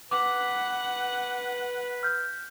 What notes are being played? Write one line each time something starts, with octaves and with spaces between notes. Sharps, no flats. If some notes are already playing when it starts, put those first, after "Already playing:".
B4 F#5 D6
F6 G6